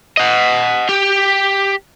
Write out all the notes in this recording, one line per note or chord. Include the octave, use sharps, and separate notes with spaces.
D#5 F#5
G4